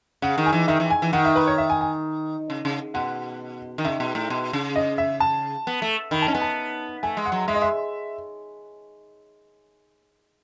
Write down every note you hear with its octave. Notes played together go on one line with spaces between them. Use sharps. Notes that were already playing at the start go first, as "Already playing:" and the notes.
C#3 F#5
D#3
G#5
E3
D#3 E5
E3
G#5
E3
D#3 F#5
E5
B4
C#5
E5
G#5
G#5
C#3
C#3
B2 F#5
D#3
C#3 E5
B2
A2
B2
C#3
D#5
E5
A5
B3
A3
D#3 B5
A5
C#4
B3 G#5
A5
A3 G#5
G#3
F#5
F#3
G#3 E5
D#5
E5